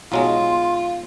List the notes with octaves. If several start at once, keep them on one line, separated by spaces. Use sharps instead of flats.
B1 F#3 G#3 F4 C6